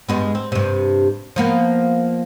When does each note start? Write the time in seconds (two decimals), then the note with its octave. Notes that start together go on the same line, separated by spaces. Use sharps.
0.09 G2 G#3 B3
0.35 C4
0.52 G2 C3
1.36 F3 A#3 B3